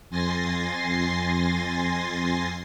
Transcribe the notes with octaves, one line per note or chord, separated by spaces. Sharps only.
F2 G#5 C6 A6 A#6 C7